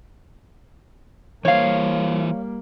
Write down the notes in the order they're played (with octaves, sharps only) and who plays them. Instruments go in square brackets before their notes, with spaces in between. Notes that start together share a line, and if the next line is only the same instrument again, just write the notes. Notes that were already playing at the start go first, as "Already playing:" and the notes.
[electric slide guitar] E3 C5 [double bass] G3 A#3 [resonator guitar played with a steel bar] C#5 F5